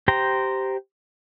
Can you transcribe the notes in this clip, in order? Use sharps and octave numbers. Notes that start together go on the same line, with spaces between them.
G4 C5 G5 A#5